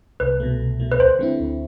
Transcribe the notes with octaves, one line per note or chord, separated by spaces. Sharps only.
C2 B4
B2 A3
C2
B2 A3
B4
D2 C5
D3 A3 C4 E4
D2